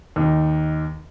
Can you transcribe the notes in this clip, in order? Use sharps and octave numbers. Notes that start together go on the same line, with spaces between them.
D#2 D#4